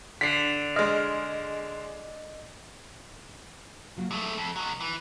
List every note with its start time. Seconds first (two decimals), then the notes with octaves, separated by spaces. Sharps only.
0.21 D3 B6 C7
0.76 G#3 D#5 F6
3.96 C#3 F#3 A#3
4.11 G2 G#3 A3
4.37 F2
4.56 B2 F#3
4.80 E3